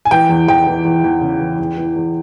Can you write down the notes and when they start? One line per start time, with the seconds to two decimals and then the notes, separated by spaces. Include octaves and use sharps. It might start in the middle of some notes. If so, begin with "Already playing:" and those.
0.05 G#5
0.11 E3 G5
0.29 E2
0.48 E2 G5
0.67 E3
0.85 E2
1.04 E2
1.21 C#3
1.40 E3
1.59 E2
1.77 E3
1.96 E2